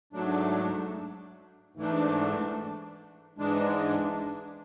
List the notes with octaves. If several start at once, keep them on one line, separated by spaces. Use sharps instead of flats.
G#2 F#3 A3 D4
G#2 E3 A3 D4
G#2 E3 G#3 D4